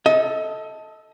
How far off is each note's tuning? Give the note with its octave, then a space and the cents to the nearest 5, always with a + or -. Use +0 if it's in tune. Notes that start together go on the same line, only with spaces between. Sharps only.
A4 +0 D#5 +30